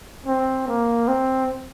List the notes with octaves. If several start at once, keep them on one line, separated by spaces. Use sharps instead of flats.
C4
A#3
C4